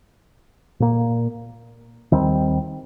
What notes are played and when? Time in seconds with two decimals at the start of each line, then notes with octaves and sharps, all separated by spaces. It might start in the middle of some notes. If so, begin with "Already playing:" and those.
0.80 A#2 A#3
2.12 D#2 D#3 G3 C4